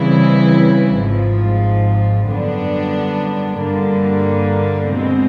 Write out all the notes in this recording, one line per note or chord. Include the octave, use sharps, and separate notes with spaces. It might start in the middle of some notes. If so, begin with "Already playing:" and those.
Already playing: C#3 E3 G3 C4 E4
G#1 G#2 F3
F#2 D3 G3 B3 D4
G2 D3 G3 A#3
B2 G#3 C4